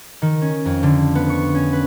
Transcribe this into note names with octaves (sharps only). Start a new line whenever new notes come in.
D#3
C#4
F2
D3
B3
C#6
C#4
B4